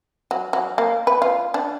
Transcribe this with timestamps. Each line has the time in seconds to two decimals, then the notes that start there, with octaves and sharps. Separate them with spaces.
0.31 F#3
0.53 F#3
0.78 A#3
1.07 B4
1.22 F4
1.54 D4